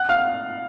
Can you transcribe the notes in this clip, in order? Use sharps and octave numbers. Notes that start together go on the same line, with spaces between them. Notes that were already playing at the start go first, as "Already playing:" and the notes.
Already playing: F#5 F#6
F5 F6